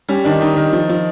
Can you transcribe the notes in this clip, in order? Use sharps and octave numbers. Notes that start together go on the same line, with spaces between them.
G3 C#4
D#3 D4
D#3 D#4
D#3
F3
F3